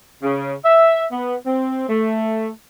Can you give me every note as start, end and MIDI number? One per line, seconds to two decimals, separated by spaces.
0.23 0.53 49
0.65 1.04 76
1.12 1.36 59
1.46 1.85 60
1.89 2.49 57